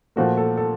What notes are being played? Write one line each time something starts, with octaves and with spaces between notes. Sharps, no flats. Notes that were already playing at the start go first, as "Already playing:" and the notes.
A#2 F3 A3 F#4
A4
A4